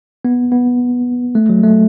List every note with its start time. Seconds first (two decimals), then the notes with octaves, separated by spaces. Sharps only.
0.25 B3
0.52 B3
1.35 A3
1.49 F#3
1.63 A3